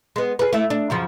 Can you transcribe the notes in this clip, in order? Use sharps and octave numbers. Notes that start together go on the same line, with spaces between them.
G#3 B3
G#4 B4
A3 E4
D4
F#2 C#3 F3